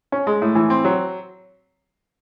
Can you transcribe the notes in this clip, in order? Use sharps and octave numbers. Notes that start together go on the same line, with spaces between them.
C#4
G#3
A2
E3
C4
F#3